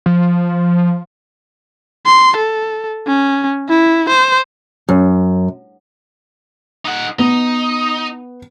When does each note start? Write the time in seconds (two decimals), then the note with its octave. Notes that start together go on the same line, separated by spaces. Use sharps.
0.06 F3
2.06 C6
2.37 A4
3.07 C#4
3.69 E4
4.09 C5
4.89 F#2
6.85 D#4 F#5
7.19 B3 D#4